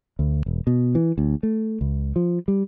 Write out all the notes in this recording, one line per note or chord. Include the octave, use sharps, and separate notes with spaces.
D2
E1
B2
E3
D2
A3
C#2
F3
G3